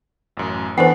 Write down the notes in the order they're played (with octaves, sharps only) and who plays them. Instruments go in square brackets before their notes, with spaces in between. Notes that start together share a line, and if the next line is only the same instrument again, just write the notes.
[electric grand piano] A1 F#2
[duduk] E3 [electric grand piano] B3 D4 [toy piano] C5 F#5